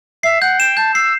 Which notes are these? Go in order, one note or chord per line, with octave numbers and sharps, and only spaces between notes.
E5 C7
F#5 G6
G5 E7
A5 G6
E6 C7